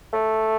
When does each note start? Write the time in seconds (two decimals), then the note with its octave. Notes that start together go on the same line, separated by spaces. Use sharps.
0.13 A3